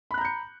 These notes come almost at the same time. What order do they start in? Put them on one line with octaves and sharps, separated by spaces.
B5 F#6 A#5 G6 C#7